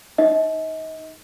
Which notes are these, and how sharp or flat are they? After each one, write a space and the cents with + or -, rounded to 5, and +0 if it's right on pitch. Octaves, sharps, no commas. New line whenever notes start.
D#4 +0 D#5 +40